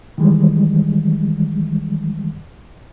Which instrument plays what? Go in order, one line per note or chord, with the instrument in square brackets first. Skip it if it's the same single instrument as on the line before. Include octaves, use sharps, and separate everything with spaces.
[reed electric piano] D#3 E3 G3 G#3